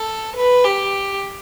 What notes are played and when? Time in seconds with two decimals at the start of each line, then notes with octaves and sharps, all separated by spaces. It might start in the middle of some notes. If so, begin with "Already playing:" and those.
Already playing: A4
0.36 B4
0.64 G4